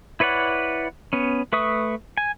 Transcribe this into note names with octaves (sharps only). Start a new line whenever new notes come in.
E4 B4 C#5 D5 F#5
B3 C#4
A3 B4 E5 C#6 D#6
G#5